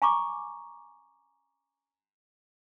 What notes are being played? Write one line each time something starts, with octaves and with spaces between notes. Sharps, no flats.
G#5 A#5 C#6 D6